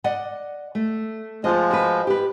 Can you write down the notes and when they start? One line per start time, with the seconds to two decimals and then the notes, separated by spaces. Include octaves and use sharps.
0.04 D5 D#5 F#5
0.75 A3
1.44 F3 G#3 F4 D#5
1.71 F#4 B4
2.07 G4 B4